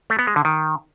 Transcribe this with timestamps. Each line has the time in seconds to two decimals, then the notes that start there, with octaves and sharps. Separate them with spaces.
0.10 A3
0.19 B3
0.27 G#3
0.36 D3
0.45 D#3